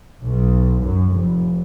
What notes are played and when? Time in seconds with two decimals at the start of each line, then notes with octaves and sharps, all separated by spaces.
0.22 B1
0.81 F#2
1.12 F1